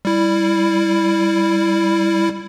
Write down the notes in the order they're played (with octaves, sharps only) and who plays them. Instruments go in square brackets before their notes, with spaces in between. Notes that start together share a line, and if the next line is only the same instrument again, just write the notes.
[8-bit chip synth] G3 E4